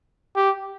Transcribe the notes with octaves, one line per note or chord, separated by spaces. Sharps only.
G4